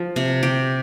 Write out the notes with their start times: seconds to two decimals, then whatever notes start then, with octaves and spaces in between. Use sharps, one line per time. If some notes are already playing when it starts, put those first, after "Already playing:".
Already playing: F3
0.16 C3
0.43 G4